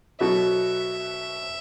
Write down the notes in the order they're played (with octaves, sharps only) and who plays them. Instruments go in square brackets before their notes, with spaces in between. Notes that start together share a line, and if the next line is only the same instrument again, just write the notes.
[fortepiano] B2 F#3 B3 F#4 A4 [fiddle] E5